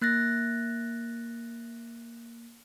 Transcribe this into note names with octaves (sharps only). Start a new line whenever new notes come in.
A#3 F#6 A6 A#6